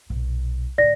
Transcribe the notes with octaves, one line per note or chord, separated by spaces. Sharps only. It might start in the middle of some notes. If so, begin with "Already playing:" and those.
B1 A#2
A2 D3 D5 A#6